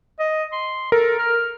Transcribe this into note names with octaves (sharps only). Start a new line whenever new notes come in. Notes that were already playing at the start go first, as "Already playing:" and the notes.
D#5
C6
A4 A#4
F6